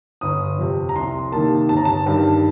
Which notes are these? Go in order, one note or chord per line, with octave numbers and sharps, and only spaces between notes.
G1 D#6
F2 C3
A#5
C2 C6
C3 D#3 A#3 A5
G1 A5
A#5
A5
G2 D#3 G3